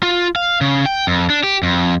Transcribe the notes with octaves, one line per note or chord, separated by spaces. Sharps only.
F4
F5
C#3
G5
F2
D4
G4
F2